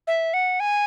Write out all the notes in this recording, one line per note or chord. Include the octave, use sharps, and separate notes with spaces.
E5
F#5
G#5